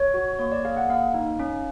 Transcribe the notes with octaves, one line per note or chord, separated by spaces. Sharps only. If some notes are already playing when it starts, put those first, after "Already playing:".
Already playing: C#5
F#4
A#3 C#5
D5
G#4 F5
F#5
A#3 F5
D#4
C#4